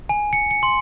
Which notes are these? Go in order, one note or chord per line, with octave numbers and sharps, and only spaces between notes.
G#5
C#7
C#7
C6